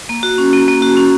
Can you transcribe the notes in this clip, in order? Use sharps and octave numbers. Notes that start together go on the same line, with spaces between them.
A#3
F#4
C#4
A#3
A#3
F#4
C#4